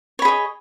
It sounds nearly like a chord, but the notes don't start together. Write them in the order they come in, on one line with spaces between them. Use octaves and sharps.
C#5 B5 G#4 D#5